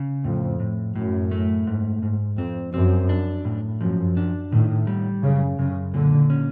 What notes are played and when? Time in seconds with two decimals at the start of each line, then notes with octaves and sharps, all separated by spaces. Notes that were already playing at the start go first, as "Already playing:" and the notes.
Already playing: C#3
0.24 F2 A2
0.60 A2
0.96 F#2 A2
1.31 A3
1.67 G#2
2.02 G#2
2.38 F2 C4
2.74 F#2 C4
3.09 D4
3.45 A2
3.81 F#2 F3
4.17 D4
4.52 A2 D#3
4.87 G3
5.23 F#2 C#3
5.59 F#2 C#3
5.94 A#2 D3
6.30 C#4